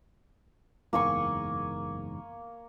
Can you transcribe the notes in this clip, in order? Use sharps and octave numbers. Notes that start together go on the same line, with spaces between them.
F#1 E2 G#2 A#3 G#5 C#6